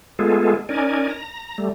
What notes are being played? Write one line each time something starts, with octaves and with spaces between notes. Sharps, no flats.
G#3 A3 B3 F4 G#4 A4
C#4 D#4 A#4 D5 G#5
A#5
G3 A3